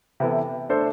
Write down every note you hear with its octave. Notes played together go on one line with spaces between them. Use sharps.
C3 E3 B3 E4 A4
A3 D4 A4 C5